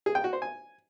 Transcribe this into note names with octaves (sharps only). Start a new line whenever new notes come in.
G#4
G5
F#4
C5
G#5